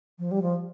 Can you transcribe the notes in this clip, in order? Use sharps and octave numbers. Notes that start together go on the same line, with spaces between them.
F3
G3
F3